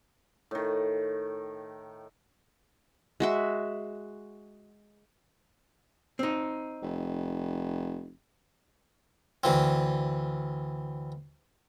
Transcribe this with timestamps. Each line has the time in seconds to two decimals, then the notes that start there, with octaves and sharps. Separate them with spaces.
0.51 A2 D#3
3.20 G#3 F#4 E5
6.19 C4 D#4
6.82 F1
9.44 D2 E3 C4